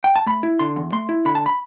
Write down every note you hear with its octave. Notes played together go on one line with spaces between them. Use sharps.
G5
A5
A3 B5
E4
D3 C6
E2
A3 C6
E4
D3 B5
A5
B5